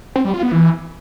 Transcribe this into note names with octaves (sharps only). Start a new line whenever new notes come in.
C4
G3
F4
B3
E3